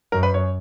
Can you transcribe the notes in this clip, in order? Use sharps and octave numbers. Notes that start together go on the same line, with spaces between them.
F#2 A#4
B4
C#5